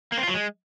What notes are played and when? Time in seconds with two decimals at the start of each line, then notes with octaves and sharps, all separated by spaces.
0.12 A#3
0.18 C4
0.23 F4
0.29 F#3
0.34 G#3